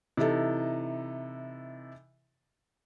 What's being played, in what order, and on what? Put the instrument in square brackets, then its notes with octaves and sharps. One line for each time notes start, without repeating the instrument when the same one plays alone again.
[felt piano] C3 E3 D#4 E4 A4